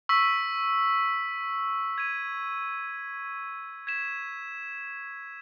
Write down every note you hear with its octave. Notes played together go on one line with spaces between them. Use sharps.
C#6 E6 B6
G#6 B6 D#7
G#6 B6 E7